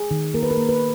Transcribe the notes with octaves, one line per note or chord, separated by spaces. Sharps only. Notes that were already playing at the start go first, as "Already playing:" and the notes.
Already playing: G#4
D#3
A#3 A#4
B4
A#4
A#3
B4